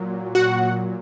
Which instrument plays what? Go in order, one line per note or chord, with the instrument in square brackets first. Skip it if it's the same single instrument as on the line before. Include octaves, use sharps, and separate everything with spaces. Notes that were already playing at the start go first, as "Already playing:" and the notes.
Already playing: [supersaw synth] A#2 F#3
F#4 F#5